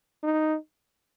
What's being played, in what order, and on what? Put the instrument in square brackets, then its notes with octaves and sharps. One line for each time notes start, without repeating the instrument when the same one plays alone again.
[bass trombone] D#4